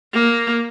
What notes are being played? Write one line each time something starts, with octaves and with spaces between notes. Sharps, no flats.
A#3